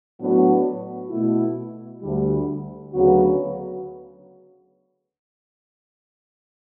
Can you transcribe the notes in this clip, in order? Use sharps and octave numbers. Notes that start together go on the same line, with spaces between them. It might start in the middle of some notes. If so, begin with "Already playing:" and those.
A2 F#3 B3 D4 F#4
B2 A3 E4
D2 D3 G3
D2 C#3 F#3 B3 F#4